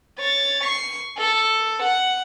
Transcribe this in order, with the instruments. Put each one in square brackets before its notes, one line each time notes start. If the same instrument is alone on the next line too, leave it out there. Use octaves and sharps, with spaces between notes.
[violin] C#5 A6
C#6 C7
A4
F#5